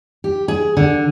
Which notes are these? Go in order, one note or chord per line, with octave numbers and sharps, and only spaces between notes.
G4
G#4
D3